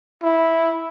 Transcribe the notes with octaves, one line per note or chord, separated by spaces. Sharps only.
E4